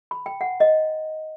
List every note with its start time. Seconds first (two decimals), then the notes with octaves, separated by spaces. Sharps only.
0.11 B5
0.26 G5
0.41 F#5
0.60 D#5